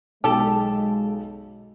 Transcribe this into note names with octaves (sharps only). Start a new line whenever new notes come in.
B1 G#3 G4 A4 A5